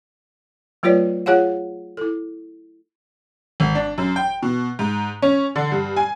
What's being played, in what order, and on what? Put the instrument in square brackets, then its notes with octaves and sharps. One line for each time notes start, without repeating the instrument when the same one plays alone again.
[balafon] F#3 A3 F4 B4 C#5 D5
F4 G#4 C#5 F5 F#5
E4 A4
[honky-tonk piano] G#1
D4
F#2
G5
B2
G#2
C#4
D3
G2
G#5